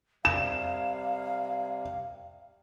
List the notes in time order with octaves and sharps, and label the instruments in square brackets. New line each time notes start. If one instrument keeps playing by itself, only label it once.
[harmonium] C3 G3 [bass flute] F5 [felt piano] E7